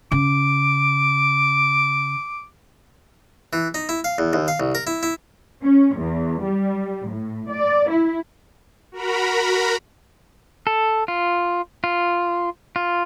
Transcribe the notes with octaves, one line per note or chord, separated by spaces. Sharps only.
C#3 D6
E3
D#4
E4
F5
E2
D#2
F5
C2
A#4
E4
E4
C#4
E2
G3
A2
D5
E4
F#4 A#4 A#5 B5
A4
F4
F4
F4